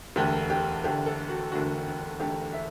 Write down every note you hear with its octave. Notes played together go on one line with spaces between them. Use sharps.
E1 D2 D3 A3 G4
G4
E1 D2 D3 A3 G4
A4
F#4
E1 D2 D3 A3 F#4
E1 D2 D3 A3 G4
E5